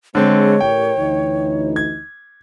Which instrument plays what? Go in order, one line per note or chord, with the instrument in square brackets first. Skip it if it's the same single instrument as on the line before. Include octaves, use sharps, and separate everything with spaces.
[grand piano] D3 C4 [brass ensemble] G#3 [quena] C#5
[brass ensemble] A1 G4 A#4 [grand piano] G5
[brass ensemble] D2 E3 D#4
[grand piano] G#6